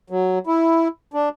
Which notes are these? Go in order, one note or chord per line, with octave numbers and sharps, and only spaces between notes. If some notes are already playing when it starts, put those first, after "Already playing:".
F#3
E4
D4